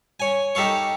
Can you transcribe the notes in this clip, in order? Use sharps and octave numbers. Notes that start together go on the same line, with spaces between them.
C#5 G#5
D#4 G4 A4 F5 C#6